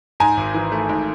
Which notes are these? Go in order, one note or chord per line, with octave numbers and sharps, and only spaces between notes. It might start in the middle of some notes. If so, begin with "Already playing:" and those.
G#2 G#5 A#5
G#1
E3
A3
G#2